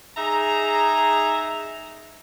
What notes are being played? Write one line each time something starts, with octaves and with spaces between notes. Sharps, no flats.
D#4 G#4 E5 A#5